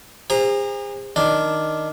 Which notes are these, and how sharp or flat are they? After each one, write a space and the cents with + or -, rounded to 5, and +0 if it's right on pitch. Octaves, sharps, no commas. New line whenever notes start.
G#4 -40 C5 +0 A#5 +0
D#3 +0 D4 +0